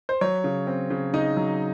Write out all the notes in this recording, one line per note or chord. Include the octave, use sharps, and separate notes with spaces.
C5
F#3 C#5
C#3
C4
C#3
C#3 D#4 D#5
F#3